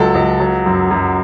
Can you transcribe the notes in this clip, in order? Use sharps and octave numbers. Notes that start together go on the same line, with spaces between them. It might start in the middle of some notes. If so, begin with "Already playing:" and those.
Already playing: C#2 F#3 A4
C#2
F#3
F#2
F#2